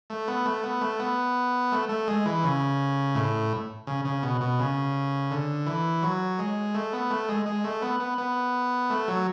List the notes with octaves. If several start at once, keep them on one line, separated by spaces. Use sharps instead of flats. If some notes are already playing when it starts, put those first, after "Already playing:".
A3
B3
A3
B3
A3
B3
A3
A3
G#3
E3
C#3
A2
C#3
C#3
B2
B2
C#3
D3
E3
F#3
G#3
A3
B3
A3
G#3
G#3
A3
B3
B3
B3
A3
F#3